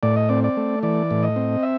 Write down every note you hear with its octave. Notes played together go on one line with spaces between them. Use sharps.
A2 D5
D#5
C4 D5
D5
A3
E3 D5
A2
D#5
C4
E5